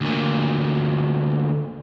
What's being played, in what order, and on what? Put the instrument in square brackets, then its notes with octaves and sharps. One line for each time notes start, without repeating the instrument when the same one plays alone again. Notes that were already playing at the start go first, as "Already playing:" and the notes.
[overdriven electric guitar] D2 A#2